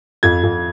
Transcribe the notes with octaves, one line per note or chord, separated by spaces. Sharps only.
F2 G#6
F2